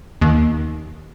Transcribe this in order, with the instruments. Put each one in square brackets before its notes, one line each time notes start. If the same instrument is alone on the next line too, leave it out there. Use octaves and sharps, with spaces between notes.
[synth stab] D#2